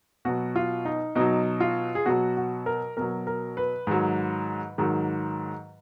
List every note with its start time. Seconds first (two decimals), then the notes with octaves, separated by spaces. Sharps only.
0.25 B2 F#3 F#4
0.56 F4
0.85 D#4
1.15 B2 F#3 D#4
1.60 F4
1.95 G#4
2.06 B2 F#3 F#4
2.37 F#4
2.66 A#4
2.97 B2 F#3 A#4
3.27 A#4
3.57 B4
3.87 G#2 D#3 F#3
4.78 G#2 D#3 F#3